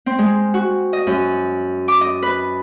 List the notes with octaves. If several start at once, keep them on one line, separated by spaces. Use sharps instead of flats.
C4
G#3
F#4
D#5
F#2
D6
D#5
B4